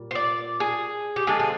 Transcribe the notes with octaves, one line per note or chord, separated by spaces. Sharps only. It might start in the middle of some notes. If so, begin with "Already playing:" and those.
Already playing: A#2 G3
C5
D5
G#4
G4
D3 F3 G#3 C4 G#4
G#4